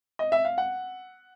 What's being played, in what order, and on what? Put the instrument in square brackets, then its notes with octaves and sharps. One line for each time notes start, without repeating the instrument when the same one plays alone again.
[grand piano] D#5
E5
F5
F#5